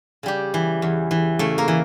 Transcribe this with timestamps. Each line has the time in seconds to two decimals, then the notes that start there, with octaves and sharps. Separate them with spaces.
0.23 C#3 G3 G4
0.54 E3
0.82 E2
1.11 E3
1.39 C#3 A3 A4
1.58 A#3 A#4
1.68 E3